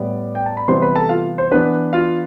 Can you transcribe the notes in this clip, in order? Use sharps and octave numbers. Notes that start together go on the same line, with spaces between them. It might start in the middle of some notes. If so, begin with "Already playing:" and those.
Already playing: A2 G3 B3 D5
G5
A5
B5
C3 E3 G3 B3 C5 C6
B4 B5
A4 A5
F4 F5
C5
E3 B3 D4 B4
F4 F5